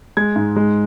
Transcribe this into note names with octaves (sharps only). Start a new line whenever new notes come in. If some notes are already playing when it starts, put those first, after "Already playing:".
G#3 G#6
G#2
G#3